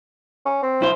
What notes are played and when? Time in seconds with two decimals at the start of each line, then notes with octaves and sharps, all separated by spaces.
0.46 C#4
0.63 C4
0.81 B1 E4 C5